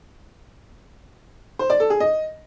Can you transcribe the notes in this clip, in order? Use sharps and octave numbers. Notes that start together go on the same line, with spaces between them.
C5
D5
A4
G#4
D#5